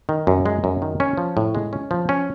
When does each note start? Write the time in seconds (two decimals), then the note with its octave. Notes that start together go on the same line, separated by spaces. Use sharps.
0.09 D#3
0.27 F#2
0.46 G#3
0.64 F#2
0.82 D#3
1.00 C#4
1.18 F3
1.37 A2
1.55 G#3
1.73 C#4
1.91 F3
2.09 C#4